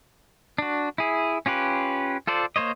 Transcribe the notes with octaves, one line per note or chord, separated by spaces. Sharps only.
D4 F#4
E4 G#4
C#4 F4 G4 B4
F4 A4 C5 D5
A#3 C5 C#5 D#5